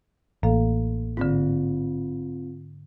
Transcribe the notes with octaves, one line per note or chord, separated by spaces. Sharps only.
A1 A#3 A4 F5
G#2 D3 C4 F4